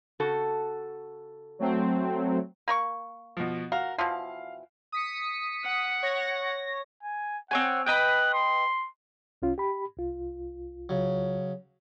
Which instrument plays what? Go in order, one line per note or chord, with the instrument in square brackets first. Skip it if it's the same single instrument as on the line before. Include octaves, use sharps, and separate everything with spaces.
[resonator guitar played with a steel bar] C#3 F#4 A4
[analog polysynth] F#3 A3 C4
[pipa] A#3 A#4 C#6
[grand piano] B2 F3
[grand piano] F#4 F5 [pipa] A#4
[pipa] B2 E3 F3 [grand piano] F5
[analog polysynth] D#6 B6 C#7
[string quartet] F#5
[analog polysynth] C#5 A#6
[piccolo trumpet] G#5
[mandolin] C4 C#5 G#5 [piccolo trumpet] F#5
[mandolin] B4 D#5 G5 [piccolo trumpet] F#6
[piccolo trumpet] C6
[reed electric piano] C2 C#4 F4
G4 B5
C2 F4
[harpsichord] C#3 F#3